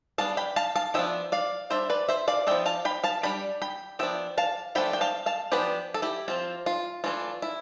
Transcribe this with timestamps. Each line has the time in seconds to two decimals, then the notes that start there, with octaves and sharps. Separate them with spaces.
0.18 G3 B3 D4 F5 A5
0.37 G5 B5
0.56 F5 A5
0.76 F5 A5
0.94 F3 B3 D4 E5 G5
1.32 D5 F5
1.70 G3 D4 C5 E5
1.90 B4 D5
2.09 C5 E5
2.28 D5 F5
2.47 F3 B3 D4 E5 G5
2.66 F5 A5
2.85 G5 B5
3.04 F5 A5
3.23 G3 D4 G5 B5
3.62 G5 B5
3.99 F3 B3 D4 E5 G5
4.38 F5 A5
4.75 F3 A3 D4 G5 B5
4.93 G5
5.01 F5 A5
5.26 F5 A5
5.52 F3 B3 D4 G4 B4
5.94 A4
6.02 E4 G4
6.28 F3 C4 F4
6.66 F4
7.04 E3 A3 D4 F4
7.42 E4